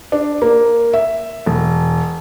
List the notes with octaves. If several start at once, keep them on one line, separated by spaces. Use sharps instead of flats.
D4
A#3
E5
E1